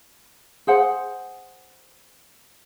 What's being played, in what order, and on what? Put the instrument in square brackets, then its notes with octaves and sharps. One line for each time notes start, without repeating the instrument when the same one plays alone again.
[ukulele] G#4 C5 F#5